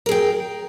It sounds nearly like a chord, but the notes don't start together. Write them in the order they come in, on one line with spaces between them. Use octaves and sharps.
A#4 G#4 G5